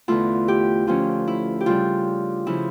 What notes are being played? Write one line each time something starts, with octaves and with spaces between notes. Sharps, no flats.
E2 D3 A3 E4 F4
G4
D2 D3 F3 C#4 F4
E4
G4
C#3 G3 D4 F4
C#3 F3 E4